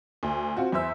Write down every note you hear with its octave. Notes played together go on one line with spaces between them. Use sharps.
D2
C4 F4 F#4
E2 C5 E5 E6